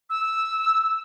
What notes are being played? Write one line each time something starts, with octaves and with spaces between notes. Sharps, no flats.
E6